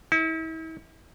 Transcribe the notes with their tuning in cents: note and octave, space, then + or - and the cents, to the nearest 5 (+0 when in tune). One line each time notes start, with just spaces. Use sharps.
E4 -40